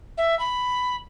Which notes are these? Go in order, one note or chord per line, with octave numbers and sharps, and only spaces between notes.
E5
B5